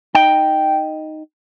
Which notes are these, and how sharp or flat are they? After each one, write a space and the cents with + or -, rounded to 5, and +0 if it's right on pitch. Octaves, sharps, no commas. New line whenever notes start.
D#4 +0 G5 +0